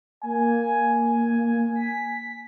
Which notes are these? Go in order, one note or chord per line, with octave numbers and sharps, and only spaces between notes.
A#3 G#5
B6